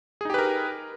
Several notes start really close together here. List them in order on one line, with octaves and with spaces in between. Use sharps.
G#4 D#4 G4 B4 A#4